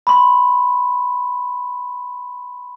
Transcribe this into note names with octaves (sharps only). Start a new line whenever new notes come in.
B5 C6